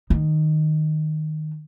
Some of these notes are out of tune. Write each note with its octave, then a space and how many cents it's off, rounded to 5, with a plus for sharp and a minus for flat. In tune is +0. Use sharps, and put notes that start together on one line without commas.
D#3 -10